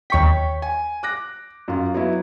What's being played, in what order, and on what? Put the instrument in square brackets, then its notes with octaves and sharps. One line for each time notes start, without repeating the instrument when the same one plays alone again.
[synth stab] D#2 C#6 B6 [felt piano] C#5 G5
[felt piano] G#5
D6 F#6 A#6
F#2 F4
F#3 B3 E4